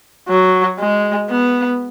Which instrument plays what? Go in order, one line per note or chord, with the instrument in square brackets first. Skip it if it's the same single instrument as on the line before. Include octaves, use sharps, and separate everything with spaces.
[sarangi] F#3
G#3
B3